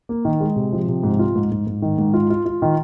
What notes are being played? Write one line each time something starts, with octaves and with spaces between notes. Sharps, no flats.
A#3
D#3
G#3
C3
F3
C3
G#2
F4
G#2
G#2
G#2
D#3
G#2
F4
F4
F4
D#3